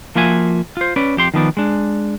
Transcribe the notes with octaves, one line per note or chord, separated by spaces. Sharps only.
F3 A#3 F4 F#4 E5 G#5
F4 C5
C#4 B4 D5
F2 G4 C6
D#3 F3 B3 D5
G#3 D4